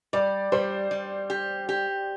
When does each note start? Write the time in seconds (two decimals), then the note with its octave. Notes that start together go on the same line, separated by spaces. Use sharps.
0.13 G3 D5
0.52 G3 C5
0.91 G3
1.30 G4
1.69 G4